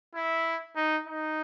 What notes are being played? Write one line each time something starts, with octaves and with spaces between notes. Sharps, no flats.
E4
D#4
D#4